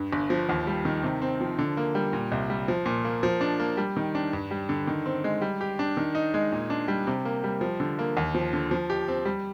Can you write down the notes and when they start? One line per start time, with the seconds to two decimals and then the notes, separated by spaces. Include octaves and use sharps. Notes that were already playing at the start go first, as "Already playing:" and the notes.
Already playing: G2
0.13 G1
0.30 F3
0.49 D#2
0.67 G3
0.85 D#3
1.03 C3
1.22 C4
1.41 F3
1.58 D3
1.77 A#3
1.95 G3
2.13 A#2
2.32 C2
2.50 G3
2.68 F3
2.86 A#2
3.05 A#3
3.23 F3
3.41 D4
3.60 A#3
3.77 G3
3.97 D#3
4.15 D4
4.33 G2
4.51 G3
4.69 D3
4.87 D#3
5.06 C4
5.24 G#3
5.42 G3
5.61 G4
5.79 D4
5.97 D#3
6.15 D#4
6.34 G#3
6.52 A#2
6.70 D4
6.88 G3
7.07 C3
7.25 A#3
7.44 G3
7.61 F3
7.80 D3
7.99 A#3
8.17 D#2
8.35 F3
8.53 D3
8.71 F3
8.90 G4
9.08 C4
9.25 G3